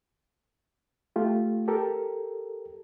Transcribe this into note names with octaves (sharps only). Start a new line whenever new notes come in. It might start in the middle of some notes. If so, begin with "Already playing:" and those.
A3 F4 G4
G4 A4 A#4